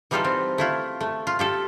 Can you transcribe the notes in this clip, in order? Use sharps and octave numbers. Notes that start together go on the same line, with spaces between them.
E3 G3 D#4 F4 G4 A4
C4
A3 E4 F4
A3
F4
F4 G4 A4